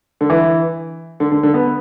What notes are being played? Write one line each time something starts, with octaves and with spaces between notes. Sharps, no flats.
D3
E3
D3
D3
D3
B3